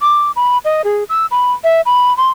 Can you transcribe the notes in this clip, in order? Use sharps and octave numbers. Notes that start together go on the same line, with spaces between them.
D6
B5
D#5
G#4
E6
B5
E5
B5
C6